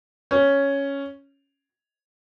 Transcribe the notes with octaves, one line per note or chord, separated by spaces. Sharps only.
C#4